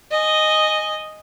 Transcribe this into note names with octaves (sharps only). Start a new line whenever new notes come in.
D#5 G#5